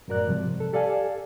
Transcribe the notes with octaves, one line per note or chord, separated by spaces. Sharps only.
F#2 A2 F#4 A#4 D5 F#6
G#2 C3 F3 G3
A4
G4 A4 D5 F5 G#5